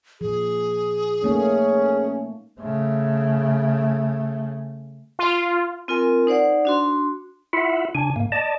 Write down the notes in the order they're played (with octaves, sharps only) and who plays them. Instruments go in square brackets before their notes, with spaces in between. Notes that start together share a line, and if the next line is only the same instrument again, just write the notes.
[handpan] A#2 F3 [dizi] G#4
[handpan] A3 A#3 D#4 [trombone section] C#4
[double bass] C#3 A3
[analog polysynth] F4
[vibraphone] C4 F4 A#4 G#5
D#4 C5 D5 F#5
D4 F#4 C6
[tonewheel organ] E4 F4 E5 F#5
C#3 D4 G#5
G#2 A#3
D5 D#5 A5